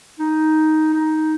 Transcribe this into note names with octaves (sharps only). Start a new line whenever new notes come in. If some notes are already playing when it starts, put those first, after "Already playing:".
D#4
D#4